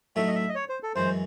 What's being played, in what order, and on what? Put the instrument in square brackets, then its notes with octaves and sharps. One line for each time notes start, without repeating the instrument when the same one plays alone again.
[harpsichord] A2 F#3 A3 D#4 [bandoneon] E5
[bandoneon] D#5
E5
D#5
C#5
C5
A4
[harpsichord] F#2 E3 G#3 [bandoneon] C5